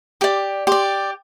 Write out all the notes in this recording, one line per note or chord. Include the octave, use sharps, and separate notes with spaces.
G4 D5 D6
G4 D5 C6